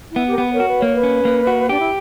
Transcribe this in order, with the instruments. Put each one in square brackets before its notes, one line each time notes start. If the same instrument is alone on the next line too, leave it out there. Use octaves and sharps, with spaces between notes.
[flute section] E4
[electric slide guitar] B3
[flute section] G4
A#4
[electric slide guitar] B3 [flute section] B4
[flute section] A#4 C#5
[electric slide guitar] F#4
[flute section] B4
[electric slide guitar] A#3 [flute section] C#5
[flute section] B4
[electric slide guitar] C#4
A#3
F#4
[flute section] D4 [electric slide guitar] G4
[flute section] E4